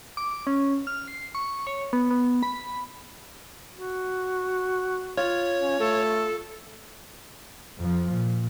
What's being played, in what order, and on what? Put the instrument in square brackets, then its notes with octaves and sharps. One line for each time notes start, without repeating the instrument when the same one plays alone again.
[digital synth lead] D6
D6
C#4
F6
C7
C#6
C#5
B3
B3
B5
[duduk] F#4
[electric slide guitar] F4 [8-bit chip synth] C#5
[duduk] C#4
[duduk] A3 [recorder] A4
[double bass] F2 F3
A#2